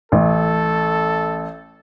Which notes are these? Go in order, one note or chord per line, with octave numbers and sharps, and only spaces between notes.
A1 A4